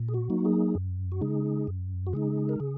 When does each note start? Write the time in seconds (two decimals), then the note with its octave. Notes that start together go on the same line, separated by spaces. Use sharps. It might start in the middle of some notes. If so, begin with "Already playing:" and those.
Already playing: A#2
0.08 G#4
0.14 F#4
0.30 F#3 A#3 D#4
0.45 G#4
0.75 F#2
1.12 F#4
1.21 C#3 G#3 D#4 G#4
1.67 F#2
2.07 F#4
2.13 C#3 G#3 D#4 G#4
2.49 A#4
2.60 C#3 G#4